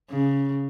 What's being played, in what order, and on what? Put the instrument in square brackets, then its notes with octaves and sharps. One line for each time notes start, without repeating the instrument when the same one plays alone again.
[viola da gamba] C#3